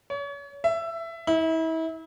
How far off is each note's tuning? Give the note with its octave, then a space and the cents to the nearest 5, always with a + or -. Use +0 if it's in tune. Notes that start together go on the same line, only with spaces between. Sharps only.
C#5 +35
E5 +15
E4 -35